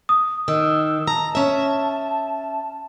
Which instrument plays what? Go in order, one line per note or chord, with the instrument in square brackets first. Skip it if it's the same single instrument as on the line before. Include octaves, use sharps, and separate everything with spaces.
[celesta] D#6
[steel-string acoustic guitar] D#3 [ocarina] E6
[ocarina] A5 [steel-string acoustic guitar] A#5
[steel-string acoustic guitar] C#4 E5